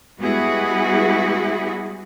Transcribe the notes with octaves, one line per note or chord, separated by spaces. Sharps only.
G3 G#3 B3 E4 F#4 G#4